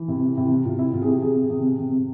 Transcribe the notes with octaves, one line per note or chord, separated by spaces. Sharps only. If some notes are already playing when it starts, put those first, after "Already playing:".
Already playing: E3
C3 E4
C3 E4
C3 F4
E4
C3 F4
G#4
G4
C3 G#4
C3
C3